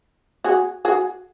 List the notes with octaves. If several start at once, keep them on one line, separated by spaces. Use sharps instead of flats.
F#4 G#4
F#4 G#4